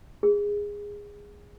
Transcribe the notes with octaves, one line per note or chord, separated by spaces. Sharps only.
G#4